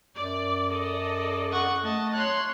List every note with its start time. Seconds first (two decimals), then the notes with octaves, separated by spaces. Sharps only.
0.17 F#2 D5
0.70 A4 D5 D#5
1.52 F#5 C#6
1.84 A3 D#5 A5
2.13 C#5 C6 F#6